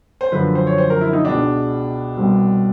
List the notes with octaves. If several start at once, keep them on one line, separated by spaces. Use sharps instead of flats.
C5
F#2 D3 F3 B4
C5
C#5
C5
A#4
E4
D#4
C#2 B2 G#3 D4
C2 B2 G3 C4